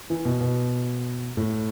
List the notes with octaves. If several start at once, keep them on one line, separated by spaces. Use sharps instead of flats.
E3
B2
B2
A2